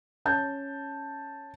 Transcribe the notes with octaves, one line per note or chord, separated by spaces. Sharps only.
C#4 A5 G6